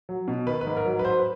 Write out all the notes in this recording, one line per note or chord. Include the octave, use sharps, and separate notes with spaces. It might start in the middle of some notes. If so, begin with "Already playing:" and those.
F#3
B2
D#3 B4
B4
G#2
A#4
F#3
B4
F#3 C5
B4